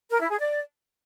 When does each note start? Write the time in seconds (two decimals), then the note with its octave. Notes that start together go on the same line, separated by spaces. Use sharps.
0.11 A#4
0.21 E4
0.30 G#4
0.39 D5